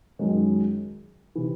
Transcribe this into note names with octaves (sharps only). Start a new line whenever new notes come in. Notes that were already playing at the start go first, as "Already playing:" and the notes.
F#2 D#3 G#3 C#4
C3 E3